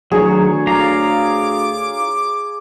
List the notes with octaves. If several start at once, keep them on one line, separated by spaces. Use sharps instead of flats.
D2 D#3 F#3 G#4 C#5
F4 F5 A#5 D6